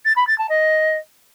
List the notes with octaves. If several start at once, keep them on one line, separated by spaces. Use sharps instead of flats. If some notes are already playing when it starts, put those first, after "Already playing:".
A6
B5
A6
A5
D#5